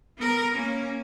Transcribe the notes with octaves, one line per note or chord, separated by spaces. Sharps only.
B3 A#4
A#3 C#4